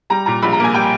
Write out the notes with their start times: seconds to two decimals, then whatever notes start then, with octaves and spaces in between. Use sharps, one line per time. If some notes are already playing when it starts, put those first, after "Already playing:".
0.10 G3 A#5
0.26 A#2 A#5
0.43 A#1 B5
0.53 A#5
0.59 A#3 G#5
0.74 G3 G5